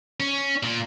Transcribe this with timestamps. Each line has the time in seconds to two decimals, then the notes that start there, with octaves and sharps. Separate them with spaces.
0.20 C#4
0.63 A#2